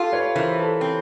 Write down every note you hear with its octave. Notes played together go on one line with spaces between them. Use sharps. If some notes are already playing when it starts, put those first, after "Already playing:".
Already playing: F4 G4 A4
B4 C#5
E3 A#4 C5
A4 B4
C4